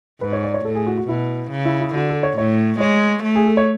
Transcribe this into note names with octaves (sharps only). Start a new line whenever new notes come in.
G#2 B4
C#5
D5
C#5
A2 A4
G#4
F#4
F#4
B2 E4
C#3
E4
E4
D3 F#4
A4
C#5
A2 C#5
G#3 C#5
A3
G#4
A4
C#5